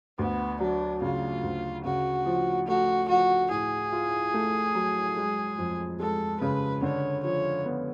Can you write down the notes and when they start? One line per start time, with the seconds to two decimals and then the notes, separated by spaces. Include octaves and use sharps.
0.19 D2 B3
0.60 F#3 D4
1.02 C#3 F4
1.43 D2
1.85 C#3 F#4
2.26 F3
2.67 A3 F#4
3.09 F3 F#4
3.51 A2 G#4
3.92 F4
4.34 A3
4.75 F#3
5.17 G#3
5.58 F2
6.00 G#3 A4
6.41 C#3 B4
6.82 D3 C#5
7.23 F3 C#5
7.65 B3